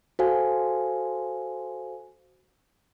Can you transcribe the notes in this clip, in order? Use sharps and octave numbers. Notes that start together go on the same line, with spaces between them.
F#4 A4 C5 F5 G#5